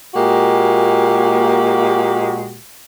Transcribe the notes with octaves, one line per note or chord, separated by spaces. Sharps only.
A#2 G#3 A#3 F#4 G4